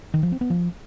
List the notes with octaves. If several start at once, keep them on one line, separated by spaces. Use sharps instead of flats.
D#3
F3
C4
B3
F3